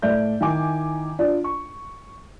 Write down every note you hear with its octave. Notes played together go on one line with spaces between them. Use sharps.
A2 A3 D5 E5 G6
D#3 E4 G#5 D6
D4 F4 D5
C#6